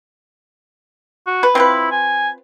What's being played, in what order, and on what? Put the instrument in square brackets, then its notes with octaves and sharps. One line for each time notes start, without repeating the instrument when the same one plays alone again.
[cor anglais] F#4
[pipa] B4
[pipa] C4 F4 B4 [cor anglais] E4
[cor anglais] G#5